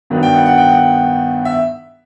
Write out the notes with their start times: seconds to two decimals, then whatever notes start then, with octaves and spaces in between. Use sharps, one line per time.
0.10 G2 D#3 F#3 B3 D4
0.23 G5
0.34 F#5
0.46 F#5
0.58 G5
0.69 F#5
1.45 E5